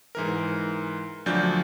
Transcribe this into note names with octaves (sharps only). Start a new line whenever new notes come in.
G#2 E3 A#4
D2 F3 F#3 D4 G6